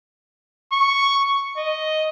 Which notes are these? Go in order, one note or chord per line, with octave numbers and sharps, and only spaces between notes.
C#6
D#5